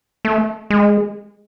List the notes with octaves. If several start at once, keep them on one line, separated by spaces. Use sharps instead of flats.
A3
G#3